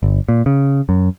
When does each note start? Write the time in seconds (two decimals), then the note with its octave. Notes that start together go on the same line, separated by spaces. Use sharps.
0.03 G1
0.29 A#2
0.46 C#3
0.89 F#2